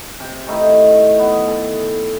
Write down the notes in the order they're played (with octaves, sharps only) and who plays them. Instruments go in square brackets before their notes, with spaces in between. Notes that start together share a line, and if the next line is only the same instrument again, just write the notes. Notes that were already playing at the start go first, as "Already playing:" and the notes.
[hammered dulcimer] C3
D#3 A3 D#4 E4
B3
A4